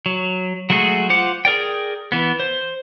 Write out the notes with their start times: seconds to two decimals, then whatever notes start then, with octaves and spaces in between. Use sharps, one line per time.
0.06 F#3
0.70 F#3 G#3 A3 F#4 G#4
1.10 F4 C5 F#5 D6
1.45 G#4 A#4 D5 G5
2.12 E3 B3
2.40 C5